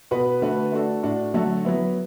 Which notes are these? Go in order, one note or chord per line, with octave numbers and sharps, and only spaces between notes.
B2 B3 F#4 B4
D3 A3 F#4 B4
A3 D4 F#4 A4
A2 A3 D4 F#4
D3 F#3 A3 F#4 A4
F#3 B3 E4